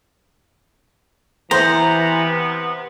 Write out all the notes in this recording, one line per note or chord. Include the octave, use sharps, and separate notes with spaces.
C3 E3 B3 C5 A#5